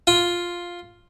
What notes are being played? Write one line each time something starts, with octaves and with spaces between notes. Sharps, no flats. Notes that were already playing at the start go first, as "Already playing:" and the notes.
F4